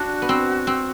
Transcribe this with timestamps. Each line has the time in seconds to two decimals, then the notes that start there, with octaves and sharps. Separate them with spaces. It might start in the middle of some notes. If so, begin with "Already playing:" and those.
Already playing: D4 F#4
0.22 B3
0.29 C4
0.67 C4